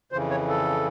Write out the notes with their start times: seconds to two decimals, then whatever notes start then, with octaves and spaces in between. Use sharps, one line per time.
0.12 F2 C#3 E3 C5
0.30 C#5
0.49 A4